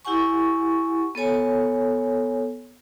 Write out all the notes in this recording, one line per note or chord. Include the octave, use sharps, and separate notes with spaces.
E4 G4 F#5 G#5 C#6
B3 A4 C#5 G#5